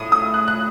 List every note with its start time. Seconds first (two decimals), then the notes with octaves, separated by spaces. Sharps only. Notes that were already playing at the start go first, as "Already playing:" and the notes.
Already playing: A2 D#6
0.12 D#6
0.34 F#6
0.48 F#6